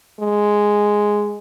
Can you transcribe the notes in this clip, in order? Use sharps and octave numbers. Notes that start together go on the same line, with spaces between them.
G#3